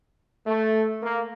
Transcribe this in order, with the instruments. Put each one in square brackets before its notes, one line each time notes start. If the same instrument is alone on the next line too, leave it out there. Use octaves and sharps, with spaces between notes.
[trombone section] A3
A#3